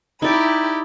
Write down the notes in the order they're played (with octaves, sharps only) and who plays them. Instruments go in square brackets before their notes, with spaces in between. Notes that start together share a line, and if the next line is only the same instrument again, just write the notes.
[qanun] D#4 D5 [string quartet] E4 G4 B5